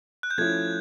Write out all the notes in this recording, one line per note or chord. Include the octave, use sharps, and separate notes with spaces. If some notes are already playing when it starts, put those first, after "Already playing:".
F#6
G6
F3 A3 C#4 E4 G#6